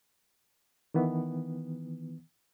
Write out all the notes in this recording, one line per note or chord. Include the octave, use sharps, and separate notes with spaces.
D#3 E3 B3